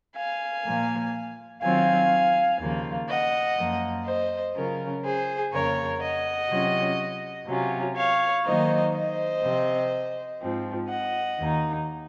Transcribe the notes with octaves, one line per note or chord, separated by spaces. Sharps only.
F5 G#5
A#2 F3 A#3
D#3 F#3 C4 F4 F5 G#5
D#2 C#3 F3 A#3 F4
D#5 F#5
F#2 F3 A#3
C5 D#5
C#3 F#3 C#4 F4 A#4
G#4 C5
F2 C#3 F3 A#3 A#4 C#5
D#5 F#5
C3 F#3 C#4 F4
C3 F#3 C#4 F4
C#5 F5
D#3 F#3 A#3 D#4 C5 D#5
C5 D#5
C3 F3 C4
G#2 F3 C4
D#5 F#5
D#2 D#3 A#3 D#4